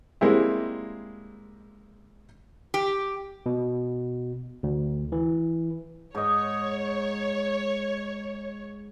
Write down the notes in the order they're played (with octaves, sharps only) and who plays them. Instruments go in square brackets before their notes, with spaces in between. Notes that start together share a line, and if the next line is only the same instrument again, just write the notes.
[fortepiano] G3 G#3 A#3 C4 E4
[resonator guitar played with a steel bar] G4
[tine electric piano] B2
D2
E3
[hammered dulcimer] G#2 D#5 [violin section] C#5